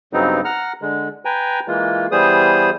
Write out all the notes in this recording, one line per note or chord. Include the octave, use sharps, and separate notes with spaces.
G2 C#3 F#3 B3 C4 D#4
F#5 A#5 F6
D3 G#3
B4 G5 G#5 A#5
E3 G#3 A#3 F4
E3 G3 B3 G#4 C5 D#6